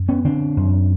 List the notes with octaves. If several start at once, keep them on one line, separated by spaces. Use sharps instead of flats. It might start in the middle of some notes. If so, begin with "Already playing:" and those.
Already playing: F#2
B3 C#4
D3 C4 D4
F#2